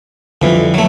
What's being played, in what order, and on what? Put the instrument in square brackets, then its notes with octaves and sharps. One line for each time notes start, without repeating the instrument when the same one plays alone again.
[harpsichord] F2 E3 [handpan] D3 F3 G3
[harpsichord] F#3 A3